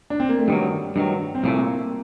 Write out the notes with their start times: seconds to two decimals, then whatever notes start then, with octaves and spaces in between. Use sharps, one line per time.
0.10 D4
0.20 C4
0.29 A#3
0.39 A3
0.48 G2 D#3 F#3 G3
0.96 G2 D#3 F#3
1.35 C4
1.43 C2 A#2 A3 A#3